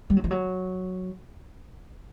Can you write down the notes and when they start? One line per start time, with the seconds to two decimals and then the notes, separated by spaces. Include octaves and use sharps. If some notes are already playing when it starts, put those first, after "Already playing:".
0.10 G3
0.17 F#3
0.24 F3
0.31 F#3